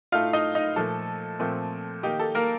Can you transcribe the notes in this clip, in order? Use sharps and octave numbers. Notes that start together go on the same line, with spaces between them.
A2 A3 D#4 F4 F5
D#4 D#5
D#4 D#5
A#2 F3 A3 A4
A#2 F3 A3 C4
D#3 A#3 D#4 G4
A4
A#3 A#4